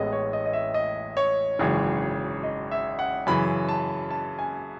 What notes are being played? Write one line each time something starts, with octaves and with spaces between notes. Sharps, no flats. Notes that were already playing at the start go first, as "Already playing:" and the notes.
Already playing: A1 A2 G#3 B3 D#5
C#5
D#5
D#5
E5
D#5
C#5
G#1 F#2 C#3 E3
D#5
E5
F#5
F#2 C#3 E3 B5
A5
A5
G#5